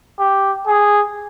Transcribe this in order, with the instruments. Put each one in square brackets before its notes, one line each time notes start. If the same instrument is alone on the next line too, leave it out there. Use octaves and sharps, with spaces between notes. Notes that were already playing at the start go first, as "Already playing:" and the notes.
[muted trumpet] G4
G#4